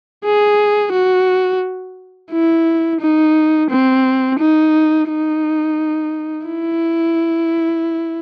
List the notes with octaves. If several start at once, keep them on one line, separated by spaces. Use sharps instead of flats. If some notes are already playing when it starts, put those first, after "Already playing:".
G#4
F#4
E4
D#4
C4
D#4
D#4
E4